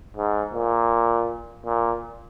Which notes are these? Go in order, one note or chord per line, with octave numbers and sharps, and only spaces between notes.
G#2
A#2
A#2